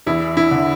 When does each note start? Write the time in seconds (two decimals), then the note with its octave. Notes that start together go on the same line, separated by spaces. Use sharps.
0.06 E2 E4
0.37 E4
0.51 D3